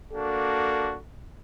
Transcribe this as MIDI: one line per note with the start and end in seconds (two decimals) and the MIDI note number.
0.12 0.95 58
0.12 0.95 62
0.12 0.95 66
0.12 1.00 69